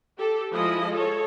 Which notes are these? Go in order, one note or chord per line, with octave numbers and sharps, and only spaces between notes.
G4 A4
F3 G#3 E4 D#5
A4 C#5